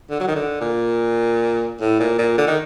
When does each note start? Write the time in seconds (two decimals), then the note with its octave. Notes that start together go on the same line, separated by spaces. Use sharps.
0.10 D3
0.20 F#3
0.28 D#3
0.35 D3
0.61 A#2
1.80 A2
2.00 A#2
2.19 A#2
2.38 D3
2.47 D#3